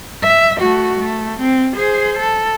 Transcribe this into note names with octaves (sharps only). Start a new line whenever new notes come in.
E5
A3 F#4
A3
C4
G#4 C5
A4